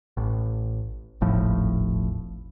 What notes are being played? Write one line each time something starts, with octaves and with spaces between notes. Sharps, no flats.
A1
D#1 G#1 A2 F3